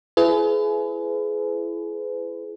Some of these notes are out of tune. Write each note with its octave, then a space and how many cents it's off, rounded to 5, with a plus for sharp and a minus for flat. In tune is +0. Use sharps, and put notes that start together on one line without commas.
E4 +30 G#4 +35 B4 +35